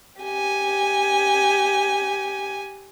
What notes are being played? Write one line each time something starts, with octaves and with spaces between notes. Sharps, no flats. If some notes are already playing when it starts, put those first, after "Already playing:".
G4 G#5